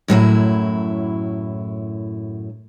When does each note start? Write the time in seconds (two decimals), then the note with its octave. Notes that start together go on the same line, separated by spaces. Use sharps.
0.08 F#2 A2 F#3 E4